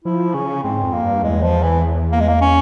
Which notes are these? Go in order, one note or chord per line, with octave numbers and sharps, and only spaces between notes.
F3 E4
C#3 C#4
G#2 C4
F2
A#3
G2
E2 G#3
F3
E3
A#3
G#3
A#3
C#4